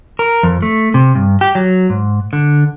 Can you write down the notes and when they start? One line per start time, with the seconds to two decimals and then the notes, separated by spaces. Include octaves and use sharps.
0.19 A#4
0.43 F2
0.62 A3
0.94 C3
1.15 G2
1.41 G4
1.55 F#3
1.90 G#2
2.33 D3